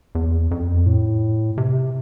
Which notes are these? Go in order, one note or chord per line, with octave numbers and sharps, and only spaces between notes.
E2
F2
A2
C3